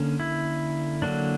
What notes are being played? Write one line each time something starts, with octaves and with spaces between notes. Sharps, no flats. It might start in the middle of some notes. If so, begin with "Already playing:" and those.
Already playing: D3 A#3 C#4
E4
D3 F#3 A#3 D4